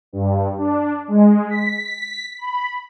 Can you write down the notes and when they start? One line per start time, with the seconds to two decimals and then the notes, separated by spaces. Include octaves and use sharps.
0.13 G2
0.58 D4
1.08 G#3
1.50 B6
2.39 B5